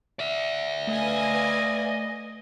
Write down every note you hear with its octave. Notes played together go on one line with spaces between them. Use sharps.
D5 E5
A3 B4 D#5 F5 G#5